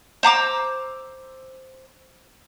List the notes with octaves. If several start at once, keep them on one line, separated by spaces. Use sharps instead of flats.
C5 A#5 D6 E6